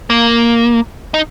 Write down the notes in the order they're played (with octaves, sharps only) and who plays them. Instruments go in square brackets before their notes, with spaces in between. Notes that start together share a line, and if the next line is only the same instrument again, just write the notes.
[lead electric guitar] A#3
D#4